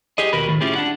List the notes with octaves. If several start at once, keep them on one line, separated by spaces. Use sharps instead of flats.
G4 G#4 D#5
D#2 B2 F#4 A#4 B4 B5
A2 D#3
C#4 E4 F4 G4 G#4
D4 F#5